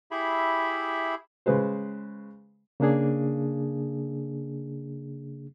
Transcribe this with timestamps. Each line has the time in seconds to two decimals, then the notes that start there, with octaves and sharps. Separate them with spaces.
0.11 E4 G4 G#4 E5 B5
1.46 C#3 G#3 B4 C5
2.80 C#3 A#3 D4 G#4